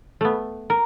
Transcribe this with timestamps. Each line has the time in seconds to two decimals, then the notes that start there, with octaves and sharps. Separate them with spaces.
0.21 A3 B3
0.70 A#4 A#5